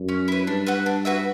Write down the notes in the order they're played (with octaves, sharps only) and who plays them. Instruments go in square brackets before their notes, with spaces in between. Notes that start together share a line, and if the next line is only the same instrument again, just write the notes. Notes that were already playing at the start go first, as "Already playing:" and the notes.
Already playing: [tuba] F#2
[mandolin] C#4
E4 B4
[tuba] G2 [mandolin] D4
[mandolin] F#4 B4 E5
D4
F#4 B4 E5